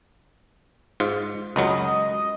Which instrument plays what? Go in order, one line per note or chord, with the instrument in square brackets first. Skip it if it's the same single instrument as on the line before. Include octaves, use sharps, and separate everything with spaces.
[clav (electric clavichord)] G#2 F4
[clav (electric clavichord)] C#2 F#2 F#3 [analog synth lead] D#5